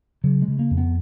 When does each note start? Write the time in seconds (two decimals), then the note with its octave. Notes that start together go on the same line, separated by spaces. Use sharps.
0.24 C#3 F#3
0.42 G#3
0.48 C#3
0.59 A#3
0.71 F2
0.77 B3